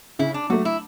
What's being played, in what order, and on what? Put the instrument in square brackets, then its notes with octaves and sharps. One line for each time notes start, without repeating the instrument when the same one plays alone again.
[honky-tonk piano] C#3 [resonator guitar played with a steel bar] E4
[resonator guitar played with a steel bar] D4
[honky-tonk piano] F#3 A3 [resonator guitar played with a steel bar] F#4
[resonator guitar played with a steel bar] E4